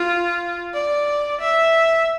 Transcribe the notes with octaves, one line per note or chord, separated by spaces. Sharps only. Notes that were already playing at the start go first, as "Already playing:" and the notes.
Already playing: F4
D5
E5